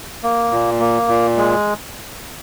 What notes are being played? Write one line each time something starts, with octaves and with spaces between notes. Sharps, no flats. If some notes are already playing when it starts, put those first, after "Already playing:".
A#3
A#2
A#3
A#2
G#3